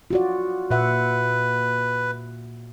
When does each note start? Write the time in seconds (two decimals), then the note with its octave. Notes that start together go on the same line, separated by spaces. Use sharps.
0.11 F4 F#4 D5
0.70 A#2 B4 E5 F#5